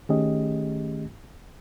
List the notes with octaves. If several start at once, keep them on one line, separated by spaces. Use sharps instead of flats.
D#3 A3 C#4 G4 G#4 D#5